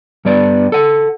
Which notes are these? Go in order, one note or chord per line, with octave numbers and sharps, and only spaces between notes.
G2 G3 B3 D5
A4 F#5